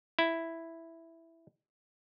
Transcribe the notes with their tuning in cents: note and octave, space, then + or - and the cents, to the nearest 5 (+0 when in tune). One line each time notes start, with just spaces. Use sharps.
E4 +0